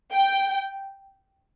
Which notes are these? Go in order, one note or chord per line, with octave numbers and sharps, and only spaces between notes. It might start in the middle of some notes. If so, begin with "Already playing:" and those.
G5